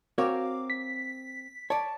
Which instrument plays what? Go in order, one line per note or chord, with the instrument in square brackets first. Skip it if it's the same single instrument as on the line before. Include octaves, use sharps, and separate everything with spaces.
[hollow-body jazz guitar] C4 A#4 C#5 [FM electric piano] F#4 F5 D6
[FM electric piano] B6
[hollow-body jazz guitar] C#5 D5 [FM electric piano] A5